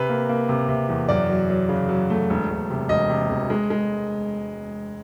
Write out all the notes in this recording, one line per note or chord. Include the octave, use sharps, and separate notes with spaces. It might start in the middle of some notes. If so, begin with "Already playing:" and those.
Already playing: C3 B4
A#3
A#3
C3
C3
E2
F#2 D5
F#3
F#3
C#3
F#3
A3
E1
E1
C3
E1 D#5
C3
E1
G#3
G#3